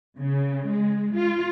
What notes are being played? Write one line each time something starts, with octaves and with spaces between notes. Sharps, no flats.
C#3
G#3
F4